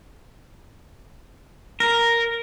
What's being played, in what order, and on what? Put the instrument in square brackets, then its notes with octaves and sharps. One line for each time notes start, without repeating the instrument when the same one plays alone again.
[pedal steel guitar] A#4